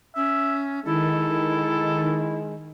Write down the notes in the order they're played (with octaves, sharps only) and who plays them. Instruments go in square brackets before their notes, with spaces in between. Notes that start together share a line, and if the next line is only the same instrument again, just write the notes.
[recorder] C#4 [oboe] E5
[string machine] D#3 [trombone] G#3 [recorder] E4 [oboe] A4